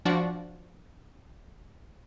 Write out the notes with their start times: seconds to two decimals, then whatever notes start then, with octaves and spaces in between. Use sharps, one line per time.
0.05 F3 D4 F#4